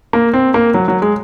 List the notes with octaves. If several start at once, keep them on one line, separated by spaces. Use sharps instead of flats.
A#3
C4
A#3
F#3
F#3
G#3